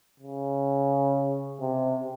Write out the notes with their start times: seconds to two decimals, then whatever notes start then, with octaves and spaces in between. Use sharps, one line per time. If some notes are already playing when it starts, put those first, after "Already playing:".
0.20 C#3
1.60 C3